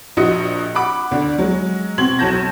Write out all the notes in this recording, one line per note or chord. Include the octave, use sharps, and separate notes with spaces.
A#1 F3 F#4 D#5 D#6 C#7
F#5 B5 D6
D2 D4
F#3 G#3
B2 C4 C6 G#6 F#7
B1 F#3 F#4 A5 G6 A#6